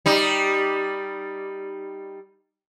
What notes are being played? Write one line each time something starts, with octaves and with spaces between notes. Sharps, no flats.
G3 D#4